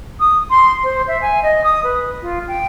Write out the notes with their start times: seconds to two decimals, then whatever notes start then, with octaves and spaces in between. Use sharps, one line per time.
0.20 D#6
0.50 C6
0.84 C5
1.08 E5
1.21 G#5
1.43 D#5
1.64 D#6
1.84 B4
2.22 F4
2.48 G5